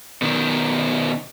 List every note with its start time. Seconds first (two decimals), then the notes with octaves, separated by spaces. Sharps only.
0.22 B2 D#3